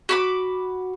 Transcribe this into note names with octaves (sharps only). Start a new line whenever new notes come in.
F#4 B5 D6